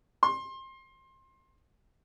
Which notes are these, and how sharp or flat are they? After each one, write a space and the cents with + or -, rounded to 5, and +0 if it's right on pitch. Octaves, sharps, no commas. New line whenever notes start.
C6 +25